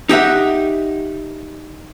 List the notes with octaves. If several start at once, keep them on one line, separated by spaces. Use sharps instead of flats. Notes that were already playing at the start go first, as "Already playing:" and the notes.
D#4 G4 E5 F#5